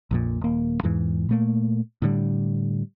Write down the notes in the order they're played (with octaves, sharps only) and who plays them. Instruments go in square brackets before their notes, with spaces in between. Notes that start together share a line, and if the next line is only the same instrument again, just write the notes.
[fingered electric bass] A#1 F2 A#2
D#1 A#3
E2 G#2 E3
A#2 A3 A#3
A2 D3 G3